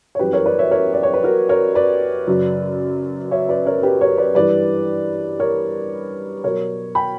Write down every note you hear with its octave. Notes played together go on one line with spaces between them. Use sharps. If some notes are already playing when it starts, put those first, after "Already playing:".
C#5
F#2 E3 G3 G4 B4
A#4 C#5
B4 D5
C#5 E5
A#4 C#5
D5
C#5
B4
F#4 A#4
A#4 C#5
B4 D5
F#2 C#3 F#3
C#5 E5
B4 D5
A#4 C#5
A#4
G4 B4
A#4 C#5
B4 D5
G2 E3 G3 B4 D5
A#4 C#5
B2 F#3 A#4 C#5
G5 B5